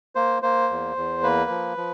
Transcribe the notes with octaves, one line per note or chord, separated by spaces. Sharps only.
A#3 C5
A#3 C5
E2
E2
A#3 B4
F3
F3